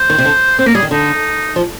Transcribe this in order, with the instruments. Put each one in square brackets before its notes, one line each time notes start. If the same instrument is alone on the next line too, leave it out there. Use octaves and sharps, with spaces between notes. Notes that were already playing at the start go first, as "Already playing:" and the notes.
Already playing: [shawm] C5
[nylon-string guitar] D#3
C3
D3
[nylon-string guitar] C4 [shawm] C5
[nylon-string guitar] A#3 [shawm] A#4
[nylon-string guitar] G3 [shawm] G#4
[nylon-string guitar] D#3
[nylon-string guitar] D3 [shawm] D#4
[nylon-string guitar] F3